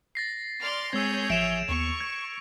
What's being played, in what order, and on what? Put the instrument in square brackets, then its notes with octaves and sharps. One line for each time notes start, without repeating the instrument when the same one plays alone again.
[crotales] A6 A#6 C7
[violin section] D5 C6 F6
[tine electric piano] G#3 C4 [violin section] G#4 C#5 G6 [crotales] E6 G#6
[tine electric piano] A1 F3 E5 [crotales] D7 E7 F7
[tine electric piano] D#2 B3 [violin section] C#6
[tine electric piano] G#6